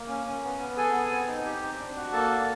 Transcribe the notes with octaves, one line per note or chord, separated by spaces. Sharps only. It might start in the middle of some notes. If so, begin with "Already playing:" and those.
Already playing: A#3
C#4
C#4
B3
B3
G#4 A4 G#5
B3
C4
D#4
G4
C4
D4
F#4
A#3 A4 A5
D4